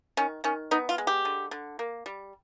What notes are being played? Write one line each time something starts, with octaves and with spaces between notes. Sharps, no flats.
D#3 C#4
D#3 C#4
B3 D#4
F4
G#3
G4
D3
D3
A#3
G3